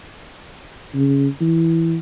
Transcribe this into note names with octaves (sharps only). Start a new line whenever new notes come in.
C#3
E3